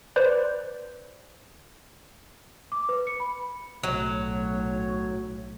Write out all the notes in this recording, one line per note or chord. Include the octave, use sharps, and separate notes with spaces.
B4 C5 D5
D6
B4
C#7
B5
B1 A2 F#3 C#5